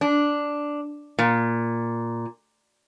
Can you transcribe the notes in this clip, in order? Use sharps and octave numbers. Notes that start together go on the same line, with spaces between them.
D4
A#2